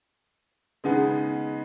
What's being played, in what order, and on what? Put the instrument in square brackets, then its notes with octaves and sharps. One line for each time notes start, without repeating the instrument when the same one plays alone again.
[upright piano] C#3 G#3 B3 D#4 G#4